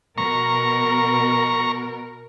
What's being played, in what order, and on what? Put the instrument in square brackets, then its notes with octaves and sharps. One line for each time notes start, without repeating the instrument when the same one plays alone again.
[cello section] B2 A#4 [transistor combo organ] A#5 C#6